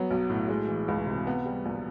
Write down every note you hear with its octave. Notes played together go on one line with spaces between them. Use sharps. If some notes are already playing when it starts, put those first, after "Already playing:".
Already playing: F#3 B3
B1
A2
G#3
E3
C#2
C3
B3
G3
A#1